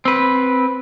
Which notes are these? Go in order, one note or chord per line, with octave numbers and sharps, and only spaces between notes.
C4 B4